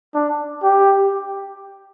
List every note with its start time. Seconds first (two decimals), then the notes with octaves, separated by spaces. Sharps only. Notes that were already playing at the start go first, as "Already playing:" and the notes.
0.15 D4
0.63 G4